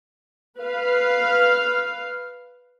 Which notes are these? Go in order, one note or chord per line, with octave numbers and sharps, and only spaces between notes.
B4 F5